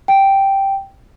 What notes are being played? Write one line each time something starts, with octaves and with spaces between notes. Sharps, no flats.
G5